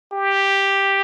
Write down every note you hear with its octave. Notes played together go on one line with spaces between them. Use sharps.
G4